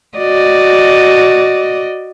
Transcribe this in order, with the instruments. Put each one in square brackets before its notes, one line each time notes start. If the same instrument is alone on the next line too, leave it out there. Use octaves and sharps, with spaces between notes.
[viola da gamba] F#4 D5 D#5